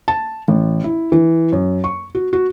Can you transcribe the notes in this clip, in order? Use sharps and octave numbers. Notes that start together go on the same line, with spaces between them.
A5
A1
E4
E3
F#2
C#6
F#4
F#4